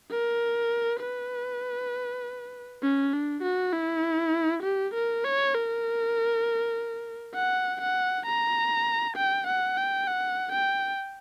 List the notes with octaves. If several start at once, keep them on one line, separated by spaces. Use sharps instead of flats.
A#4
B4
C#4
D4
F#4
E4
G4
A#4
C#5
A#4
F#5
F#5
A#5
G5
F#5
G5
F#5
G5